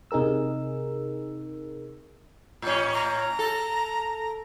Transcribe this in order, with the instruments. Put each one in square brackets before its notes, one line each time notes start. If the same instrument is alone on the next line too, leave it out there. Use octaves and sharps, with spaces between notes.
[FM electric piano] C3 D#4 G#4 A#4 E6
[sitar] A2 C#4
[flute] A#5
[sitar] A4